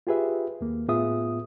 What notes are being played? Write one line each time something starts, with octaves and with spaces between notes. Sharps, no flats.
F4 G4 G#4 B4 E5
D#2 A#3
A2 B3 F4 G#4 E5 D#6